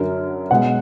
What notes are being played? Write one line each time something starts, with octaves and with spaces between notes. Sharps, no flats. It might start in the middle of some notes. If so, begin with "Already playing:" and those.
Already playing: F#2 D3 F#3 A#4
B2 G#3 F#5